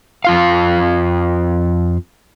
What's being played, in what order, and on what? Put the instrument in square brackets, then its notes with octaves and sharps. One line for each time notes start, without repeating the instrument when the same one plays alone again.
[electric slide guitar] F2 F4 F5